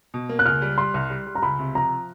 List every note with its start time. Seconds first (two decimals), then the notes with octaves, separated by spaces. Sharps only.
0.14 B2
0.29 A#3
0.39 F#6
0.45 C#2 F6
0.62 G3
0.78 G3 C6
0.94 C2
1.10 G3
1.27 G3
1.35 A#5
1.43 C#2 B5
1.59 C3
1.75 F3 A#5